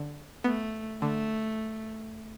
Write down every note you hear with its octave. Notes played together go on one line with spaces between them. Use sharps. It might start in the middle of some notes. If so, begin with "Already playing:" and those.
Already playing: D3
A3 B3
D3 A3